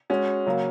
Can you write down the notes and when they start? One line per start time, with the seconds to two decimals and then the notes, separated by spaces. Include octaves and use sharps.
0.10 G#3 C#4 F#4
0.47 C#3 F#3 A#3